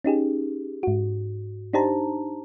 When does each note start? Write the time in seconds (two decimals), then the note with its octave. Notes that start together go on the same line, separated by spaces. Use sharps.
0.04 C#4 D#4 G4 G#4
0.83 G#2 F#4
1.73 D4 D#4 G4 C5 A5 A#5